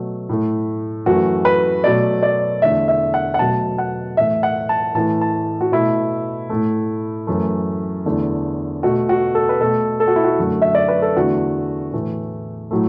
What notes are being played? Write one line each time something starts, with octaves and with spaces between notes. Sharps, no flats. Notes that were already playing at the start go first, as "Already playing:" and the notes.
Already playing: B2 F#3 A3
A2 A3
F#2 E3 A3 F#4
B4
B2 F#3 A3 D5
D5
E2 D3 A3 E5
E5
F#5
F#5
B2 F#3 A3 A5
F#5
A2 E3 A3 E5
F#5
A5
A2 E3 A3 A5
A5
F#4
B2 A3 E4
A2 A3
F#2 E3 A3
E2 D3 A3
B2 A3 F#4
F#4
A4
B4
B2 A3 A4
A4
F#4
E4
F#4
F#2 D3 A3
E5
D5
B4
A4
E2 D3 A3 F#4
A2 E3 A3
A2 F#3 A3